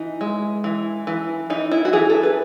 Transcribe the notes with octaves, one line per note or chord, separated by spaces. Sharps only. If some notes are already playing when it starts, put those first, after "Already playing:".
Already playing: E3 D#4
G#3
E3
E3
E3 D#4
E4
F#4
E3 G#4
A4
B4